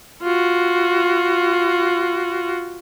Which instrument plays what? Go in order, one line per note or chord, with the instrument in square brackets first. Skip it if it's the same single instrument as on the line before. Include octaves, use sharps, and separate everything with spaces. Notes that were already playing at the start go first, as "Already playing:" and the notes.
[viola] F4 F#4